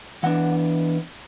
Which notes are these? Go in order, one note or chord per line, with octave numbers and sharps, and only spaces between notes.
E3 B3 D4 F#5